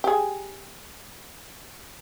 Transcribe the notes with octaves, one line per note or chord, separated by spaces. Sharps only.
G4 G#4